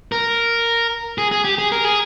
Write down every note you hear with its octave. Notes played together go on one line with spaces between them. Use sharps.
A#4
G#4
G#4
G4
G#4
A#4
G#4